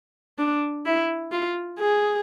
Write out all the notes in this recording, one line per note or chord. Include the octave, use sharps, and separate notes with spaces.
D4
E4
F4
G#4